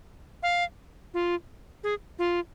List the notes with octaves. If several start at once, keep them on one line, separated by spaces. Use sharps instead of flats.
F5
F4
G#4
F4